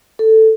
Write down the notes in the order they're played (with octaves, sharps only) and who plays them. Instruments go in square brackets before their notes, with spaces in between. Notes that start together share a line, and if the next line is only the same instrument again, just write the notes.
[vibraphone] A4